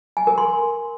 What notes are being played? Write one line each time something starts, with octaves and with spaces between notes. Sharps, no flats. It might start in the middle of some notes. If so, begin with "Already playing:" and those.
G#5
A#4
C6